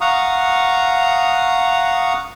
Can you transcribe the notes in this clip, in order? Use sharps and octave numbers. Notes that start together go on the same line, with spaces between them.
F5 F#5 A#5 C#6 D#6